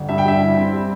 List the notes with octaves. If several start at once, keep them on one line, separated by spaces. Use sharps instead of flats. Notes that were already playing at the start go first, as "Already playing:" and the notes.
Already playing: G1
G2 E5
G5
G2 E5
E4
C4
G3